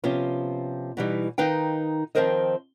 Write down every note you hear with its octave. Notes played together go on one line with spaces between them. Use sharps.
C3 F3 B3 C#4 F4
B2 E3 G3 D#4
D#3 D#4 B4 F5 G5
D#3 F3 C4 A#4 C5 D#5